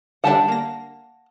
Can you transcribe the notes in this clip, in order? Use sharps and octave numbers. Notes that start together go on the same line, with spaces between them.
D3 G3 D4 F#5 A5
A#3 A#6